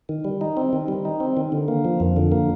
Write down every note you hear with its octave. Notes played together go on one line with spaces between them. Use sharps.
D#3
G3
D#4
C4
D#3
G3
D#4
C4
D#3
D3
A#3
F3
F2
D3
A#3